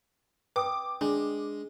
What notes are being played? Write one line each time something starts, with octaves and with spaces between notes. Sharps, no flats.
B4 G5 D6 D#6
G#3 D4